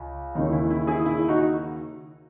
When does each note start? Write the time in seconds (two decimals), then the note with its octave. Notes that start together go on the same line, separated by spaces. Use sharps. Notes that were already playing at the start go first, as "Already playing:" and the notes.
Already playing: C#2
0.35 D#2 C#3 E3 D#4
0.52 E4
0.70 E4
0.87 E4 G#4
1.06 E4
1.28 D#4 F#4